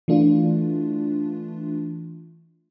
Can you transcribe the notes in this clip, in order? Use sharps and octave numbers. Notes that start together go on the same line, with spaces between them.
E3 A3 D4 F4